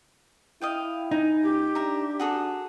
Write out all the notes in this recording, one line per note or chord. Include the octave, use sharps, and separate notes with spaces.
E4 D#5 F5 G5
D#4 G#5
C#2 G4
D4 E5 A#5
F#4 G#4 A4